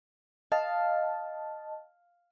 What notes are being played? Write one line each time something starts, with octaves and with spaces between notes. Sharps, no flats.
D#5 F5 A5